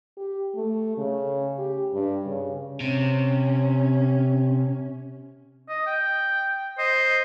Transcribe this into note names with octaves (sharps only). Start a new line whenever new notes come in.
G4
A3
C#3
G4
G2
C#3
C3 C#4
D#5
G5
C5 D#5